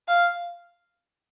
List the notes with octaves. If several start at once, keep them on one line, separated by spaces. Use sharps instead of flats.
F5